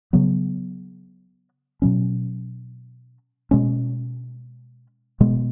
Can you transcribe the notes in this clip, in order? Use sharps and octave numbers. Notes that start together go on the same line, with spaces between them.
C#3 F#3 B3
B2 F#3 C#4
B2 G#3 C#4
B2 G#3 B3